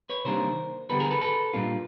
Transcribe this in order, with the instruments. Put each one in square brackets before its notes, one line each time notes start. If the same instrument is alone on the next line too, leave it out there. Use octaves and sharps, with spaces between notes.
[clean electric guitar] B4 C#5
C3 D#3 G3 A#3 D4 A#4 C5
D3 G3 B3 A4 B4
G#4 A#4
A4 B4
A4 B4
A#2 G3 A#3 D4 F4